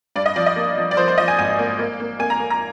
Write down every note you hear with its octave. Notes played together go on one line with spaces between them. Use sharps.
G2 D5
D#5
F3 D5
D#5
A#3
F3
D5
F3 C5
C5
F3 D#5
G#5
G#1 G#5
A#3
A#3
A#3
A#3 G#5
A#5
A#3
A#5